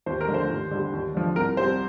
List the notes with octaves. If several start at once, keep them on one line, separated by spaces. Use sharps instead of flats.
D#2 C5
A#4
D3 F3 A3
C5
D#2
D3 G3
D#2
D3 F3
C2 A#4
C3 G3 C5